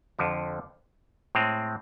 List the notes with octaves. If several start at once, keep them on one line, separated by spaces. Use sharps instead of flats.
F2 D3 F3
A2 G#3 C4